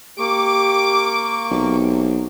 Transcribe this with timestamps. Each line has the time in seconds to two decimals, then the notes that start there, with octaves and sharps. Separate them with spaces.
0.19 A#3 G4 C#6 D6
1.51 B1 C3